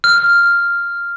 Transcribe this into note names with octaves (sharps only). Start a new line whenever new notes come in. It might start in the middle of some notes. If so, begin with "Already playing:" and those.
F6